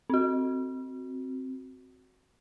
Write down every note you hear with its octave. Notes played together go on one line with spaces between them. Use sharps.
C4 F#4